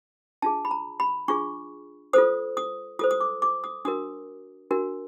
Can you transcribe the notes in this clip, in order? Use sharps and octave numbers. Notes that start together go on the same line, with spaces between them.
D4 F4 G#4 A5
B5
A#5
B5
D4 F4 G#4 C#6
F4 A4 C5 D#6
D#6
F4 A4 C5 D#6
D#6
D6
D6
D#6
D4 F#4 A#4 D#6
D4 F#4 A#4